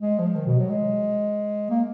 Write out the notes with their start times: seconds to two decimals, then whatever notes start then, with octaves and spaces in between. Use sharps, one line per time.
0.02 G#3
0.19 F3
0.36 D#3
0.47 B2
0.59 F#3
0.70 G#3
1.70 A#3